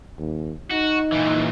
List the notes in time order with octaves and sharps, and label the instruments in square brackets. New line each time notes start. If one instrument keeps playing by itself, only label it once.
[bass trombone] D#2
[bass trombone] D#4 [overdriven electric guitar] F#4
[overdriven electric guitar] A#2 E3